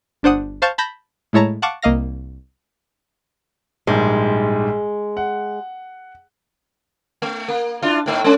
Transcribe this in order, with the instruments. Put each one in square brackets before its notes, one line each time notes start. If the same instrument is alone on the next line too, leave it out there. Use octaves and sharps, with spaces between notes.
[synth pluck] G1 D4 C5 F#5 D#6
C5 F5 A5 C#6 G6 A6
A5 B5 G6 A#6
A2 G#3 E4 C#5 A5 A#5
F5 F#5 A5 C#6 D6 F#6
C2 A#3 D#5 F5 A#6
[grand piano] A#1 G#2 G3 [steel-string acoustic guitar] G#3
[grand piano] F#5
[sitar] A3
A#3
D4 E4 F4
A2 A3 D#4
G#3 C#4 D4